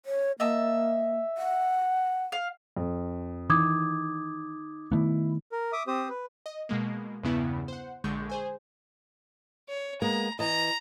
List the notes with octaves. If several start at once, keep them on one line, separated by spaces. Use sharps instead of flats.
C#5
A#3 D#5 E5 A5
F#5
F5
F2
D#3 E3 D6 D#6 G#6
D#3 A3 B3 E4
A#4
E5 D6 D#6
C4 G4 C5 D#6
B4
D#5
B2 G#3 A#3
E2 G2 C#3 B3 E4
C5 F#5
A#1 D3 G#3 C#6 G6
G#4 C5 G#5
C#5
G#3 A#3 B3 A#5
E3 D#5 A#5